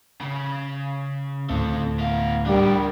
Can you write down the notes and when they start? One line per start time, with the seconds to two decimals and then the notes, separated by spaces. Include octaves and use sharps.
0.21 C#3
1.50 D2 A2 C4 A4
1.99 B3 F5
2.46 G3 D4 A#4